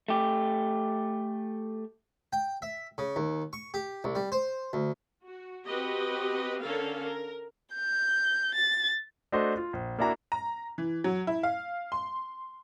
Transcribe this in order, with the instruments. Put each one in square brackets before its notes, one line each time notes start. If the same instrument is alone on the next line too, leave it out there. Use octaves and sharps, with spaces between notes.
[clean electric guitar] A3 G4
[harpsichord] G5
E5
C#3
D#2
C#6
G4
C2
G3
C5
D2
[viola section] F#4
C4 F#4 G4 B4 D#5
D3 C#4 A4 A#4 F5
A#4
[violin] G6
A6
[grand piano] A3 D4 F#4 A4 C5 D#5
F4
A#1
A#3 D4 E4 F#4 A#5
[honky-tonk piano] A#5
E3
F#3
E4
F5
C6